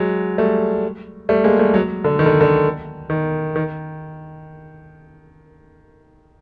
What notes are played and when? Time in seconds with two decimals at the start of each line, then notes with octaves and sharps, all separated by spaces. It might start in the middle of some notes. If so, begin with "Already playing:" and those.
Already playing: F#3 G#3
0.38 G3 A3
1.29 G3 A3
1.44 G#3 A#3
1.59 G3 A3
1.74 F#3 G#3
2.04 D3
2.19 D#3
2.26 D3
2.41 D3
3.10 D#3
3.56 D#3